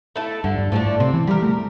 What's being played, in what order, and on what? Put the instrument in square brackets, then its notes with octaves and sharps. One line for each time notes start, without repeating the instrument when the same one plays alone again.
[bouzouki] A3 E4 A4
[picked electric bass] G2 [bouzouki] D3
[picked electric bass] G2
[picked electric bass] A2 [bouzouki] F3 A3 D4
[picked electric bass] A2
[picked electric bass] C3 [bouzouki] C4
[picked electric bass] E3
[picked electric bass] G3 [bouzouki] G4 A#4
[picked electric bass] A3